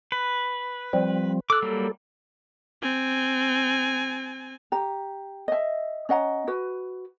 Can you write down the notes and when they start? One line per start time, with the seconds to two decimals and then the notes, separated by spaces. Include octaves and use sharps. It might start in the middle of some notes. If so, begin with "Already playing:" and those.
0.12 B4
0.93 F3 G3 C4
1.50 A4 D6 F#6
1.62 F#3 G3 A#3
2.82 C4 G#5
4.72 G4 A#5
5.48 D#5 E5
6.09 C#4 D#5 F#5 A#5
6.48 F#4 B4